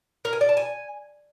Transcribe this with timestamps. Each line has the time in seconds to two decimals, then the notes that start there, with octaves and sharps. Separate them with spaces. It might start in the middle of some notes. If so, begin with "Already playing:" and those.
0.25 A#4
0.33 G#5
0.41 D5
0.49 A5
0.57 G#5